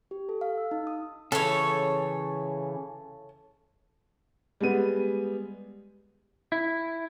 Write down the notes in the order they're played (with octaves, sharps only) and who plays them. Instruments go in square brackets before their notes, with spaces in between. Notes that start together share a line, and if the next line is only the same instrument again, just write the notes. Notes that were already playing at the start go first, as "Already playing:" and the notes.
[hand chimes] G4
A4
F5
E6
D#4
D#6
[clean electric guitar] C#3 E3 [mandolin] A4 C#5
[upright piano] G3 G#3 B3 D#7
[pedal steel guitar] E4